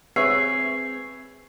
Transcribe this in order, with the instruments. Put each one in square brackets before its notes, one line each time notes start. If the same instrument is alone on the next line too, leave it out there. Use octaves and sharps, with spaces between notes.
[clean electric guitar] C4 G#4 [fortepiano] B4 C#5 E5 [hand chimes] C7